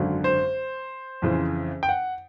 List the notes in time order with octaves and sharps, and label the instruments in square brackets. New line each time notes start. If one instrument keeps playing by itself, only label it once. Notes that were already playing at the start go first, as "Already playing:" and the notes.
Already playing: [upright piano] G#1 F#2 D3
[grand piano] C5
[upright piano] F2 C#3 E3
[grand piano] G5
F#5